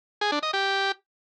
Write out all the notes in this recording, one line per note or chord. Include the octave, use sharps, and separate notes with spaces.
G#4
D4
D#5
G4